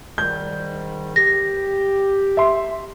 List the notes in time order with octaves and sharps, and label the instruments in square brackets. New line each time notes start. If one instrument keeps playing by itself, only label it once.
[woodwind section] G#2 D#3 G3 [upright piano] G6
[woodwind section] G4 [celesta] A#6
[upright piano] E5 C6